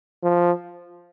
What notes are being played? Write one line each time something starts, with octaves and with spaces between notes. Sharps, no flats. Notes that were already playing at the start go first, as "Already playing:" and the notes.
F3